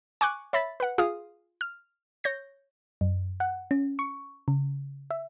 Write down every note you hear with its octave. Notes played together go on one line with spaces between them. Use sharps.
G#5 C#6 D6 F#6
C#5 E5 B5 A6 B6
B4 F#5
F4 G#4 F5 D#6
F6
C#5 G6 A#6
F#2
F#5
C#4
C#6
C#3
E5